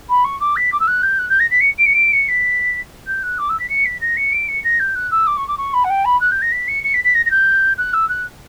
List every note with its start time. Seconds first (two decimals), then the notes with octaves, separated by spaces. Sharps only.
0.09 B5
0.24 C#6
0.41 D6
0.56 B6
0.73 D6
0.80 E6
0.88 F#6
1.03 G6
1.19 F#6
1.30 G6
1.40 A#6
1.51 B6
1.61 C#7
1.78 D7
1.86 C#7
1.93 D7
2.13 C#7
2.29 B6
3.07 G6
3.23 F#6
3.38 D6
3.49 E6
3.60 B6
3.70 C#7
3.86 B6
4.01 A#6
4.17 C#7
4.33 D7
4.48 C#7
4.64 A#6
4.80 G6
4.95 F#6
5.11 E6
5.27 D6
5.37 C#6
5.48 D6
5.58 C#6
5.74 B5
5.84 F#5
5.90 G5
6.05 B5
6.21 F#6
6.32 G6
6.42 A#6
6.52 B6
6.68 C#7
6.84 C#7
6.94 B6
7.04 B6
7.15 A#6
7.26 A#6
7.31 G6
7.78 F#6
7.94 E6
8.09 F#6